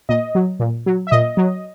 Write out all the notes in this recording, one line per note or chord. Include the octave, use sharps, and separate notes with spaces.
A#2 D#5
F#3
A#2
F#3
E5
A#2 D#5
F#3